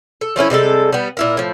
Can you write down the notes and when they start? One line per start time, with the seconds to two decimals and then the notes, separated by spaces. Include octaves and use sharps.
0.21 A4
0.36 F3 A3 C#4 E4
0.50 C3 G3 G#3 A4
0.92 G3 B3
1.17 A#2 E4 A#4
1.37 A2 F3